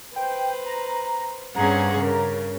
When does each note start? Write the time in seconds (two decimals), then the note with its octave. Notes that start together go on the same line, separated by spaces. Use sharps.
0.16 B4 C5 G5
0.66 A#5
1.56 G2 C4 C#4 G#4 F#5 A#5
1.99 C#3 A#4